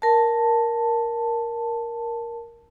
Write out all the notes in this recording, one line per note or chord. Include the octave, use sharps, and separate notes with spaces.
A#4 A5